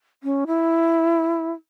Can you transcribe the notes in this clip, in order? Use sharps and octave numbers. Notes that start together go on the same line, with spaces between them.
C#4
E4